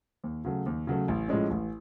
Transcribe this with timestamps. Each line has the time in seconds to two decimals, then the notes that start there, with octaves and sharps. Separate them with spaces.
0.24 D#2
0.45 C#3 F#3 A3
0.66 D#2
0.87 C#3 F#3 A3
1.08 A1
1.28 A2 F3 G#3 C#4
1.50 A1